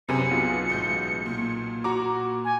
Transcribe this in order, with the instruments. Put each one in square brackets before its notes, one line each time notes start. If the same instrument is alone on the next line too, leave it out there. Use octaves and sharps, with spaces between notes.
[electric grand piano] F#2 C3 [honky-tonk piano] G#4 B4 G#5 [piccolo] C#7
[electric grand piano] B1 B2 F4
[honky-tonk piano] A1 G#3 G6
A#2
[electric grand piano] F#4 A#5 D6
[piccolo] G#5